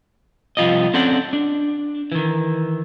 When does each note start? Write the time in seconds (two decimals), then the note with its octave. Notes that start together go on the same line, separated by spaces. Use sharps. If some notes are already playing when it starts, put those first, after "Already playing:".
0.57 C2 F3 F4 G4 D#5
0.94 C4 C#4 A4 C5 D5 F#5
1.33 D4
2.12 D#3 E3